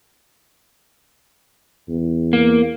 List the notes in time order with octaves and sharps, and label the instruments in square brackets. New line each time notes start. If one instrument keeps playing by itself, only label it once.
[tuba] E2
[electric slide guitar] A#3